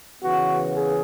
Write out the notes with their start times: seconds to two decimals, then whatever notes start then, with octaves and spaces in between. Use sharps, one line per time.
0.22 C#3 E3 B3 F#4
0.73 G#4